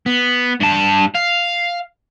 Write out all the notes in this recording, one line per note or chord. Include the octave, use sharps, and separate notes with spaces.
B3
G2 A5
F5